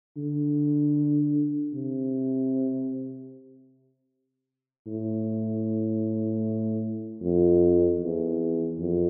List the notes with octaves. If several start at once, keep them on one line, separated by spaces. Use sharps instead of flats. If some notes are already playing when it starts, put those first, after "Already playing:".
D3
C3
A2
F2
E2
F2